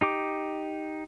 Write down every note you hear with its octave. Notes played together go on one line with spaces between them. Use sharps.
D#4 G4 D6